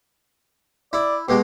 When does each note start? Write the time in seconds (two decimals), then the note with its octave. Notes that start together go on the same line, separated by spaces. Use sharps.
0.93 E4 D5
1.29 B2 G#3 G4